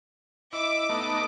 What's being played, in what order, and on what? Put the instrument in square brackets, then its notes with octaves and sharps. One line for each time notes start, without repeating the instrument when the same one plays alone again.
[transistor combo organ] E4 [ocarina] D#5 [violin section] D6
[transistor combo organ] A3 B3 D#4